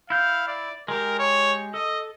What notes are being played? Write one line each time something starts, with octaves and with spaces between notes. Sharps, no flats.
E4 F5 G6
D5
G#3 G4 A#4
C#5
A4 D#5